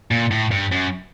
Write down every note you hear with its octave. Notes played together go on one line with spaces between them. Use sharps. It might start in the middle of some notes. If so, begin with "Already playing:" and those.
A#2
A2
G2
F#2